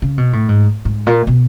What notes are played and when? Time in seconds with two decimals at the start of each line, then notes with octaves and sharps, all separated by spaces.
0.02 C#3
0.18 B2
0.33 A2
0.49 G#2
0.85 G#2
1.07 A#2
1.27 B2